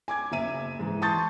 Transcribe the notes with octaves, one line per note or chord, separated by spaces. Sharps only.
G#5 D6 G#6
F#1 E5 D#7
G#2 E3
A5 C6 C#6 D#6 G6 A6